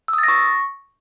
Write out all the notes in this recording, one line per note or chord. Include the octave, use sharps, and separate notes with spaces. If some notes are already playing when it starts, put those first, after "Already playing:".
E6
D#6
A6
A#6
C#6